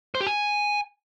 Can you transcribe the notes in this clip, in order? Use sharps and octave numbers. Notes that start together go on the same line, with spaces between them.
C5
G4
G#5